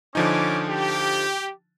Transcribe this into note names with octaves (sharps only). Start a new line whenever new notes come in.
D3 F3 C#4 D#4 G#5 D6
G4